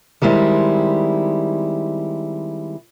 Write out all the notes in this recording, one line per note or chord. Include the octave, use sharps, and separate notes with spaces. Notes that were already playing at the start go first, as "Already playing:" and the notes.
D#3 G3 G#3 C4 E4